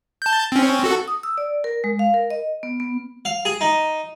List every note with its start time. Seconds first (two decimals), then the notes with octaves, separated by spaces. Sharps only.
0.22 A5 G6
0.52 C4 C#4
0.84 F#4 A4
1.08 D#6
1.23 E6
1.38 D5
1.64 A#4
1.84 G#3
1.99 F5
2.14 A#4
2.30 D#5
2.63 B3
2.80 B3
3.25 F5
3.45 G#4
3.61 D#4